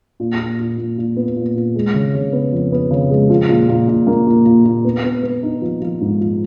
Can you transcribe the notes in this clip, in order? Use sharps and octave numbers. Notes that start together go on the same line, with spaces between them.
A#2
A#2
A#2
A#2
A#2
B3
A#2
A#2
G#3
C#3
C#3
B3
F2
B3
C#3
G#3
F3
A#2
A#2
A#2
A#3
A#2
A#2
A#2
B3
B3
B3
D#4
F3
F3
G#2
F3